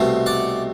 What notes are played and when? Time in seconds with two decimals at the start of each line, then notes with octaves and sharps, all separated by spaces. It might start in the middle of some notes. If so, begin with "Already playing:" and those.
Already playing: C2 B2 A3 C4
0.26 D5 F#5